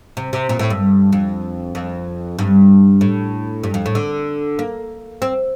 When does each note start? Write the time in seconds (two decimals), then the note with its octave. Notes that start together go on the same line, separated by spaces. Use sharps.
0.17 C3
0.33 C3
0.49 A#2
0.59 A2
0.70 G2
1.13 F2
1.75 F2
2.39 G2
3.01 A2
3.64 G2
3.74 F2
3.86 A2
3.95 D3
4.59 A#3
5.22 C4